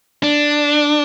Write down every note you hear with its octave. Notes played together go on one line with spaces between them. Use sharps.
D4